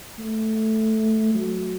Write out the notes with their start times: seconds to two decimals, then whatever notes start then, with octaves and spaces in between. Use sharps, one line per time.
0.19 A3
1.35 F#3